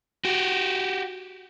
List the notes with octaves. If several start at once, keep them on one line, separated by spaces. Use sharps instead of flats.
F#4 G4